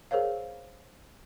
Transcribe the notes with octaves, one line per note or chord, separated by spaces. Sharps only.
G#4 A#4 C5 C#5 F5